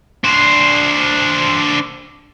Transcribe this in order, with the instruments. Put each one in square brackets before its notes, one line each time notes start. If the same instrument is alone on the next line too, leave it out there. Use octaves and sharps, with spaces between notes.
[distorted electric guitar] D4 C5